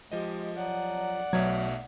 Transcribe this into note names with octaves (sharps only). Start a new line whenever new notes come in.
F3 G#3 G4 D#5
F#3 D5 F#5
B1 B2 F#3 A3 G#6